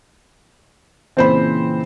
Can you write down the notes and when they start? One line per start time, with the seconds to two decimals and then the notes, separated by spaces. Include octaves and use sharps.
1.17 A#2 C#3 E3 C4 C5 B5